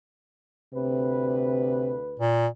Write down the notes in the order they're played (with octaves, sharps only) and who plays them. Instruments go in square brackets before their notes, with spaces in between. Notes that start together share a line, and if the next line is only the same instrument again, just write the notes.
[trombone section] D2 B4 [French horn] C3
[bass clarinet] A#2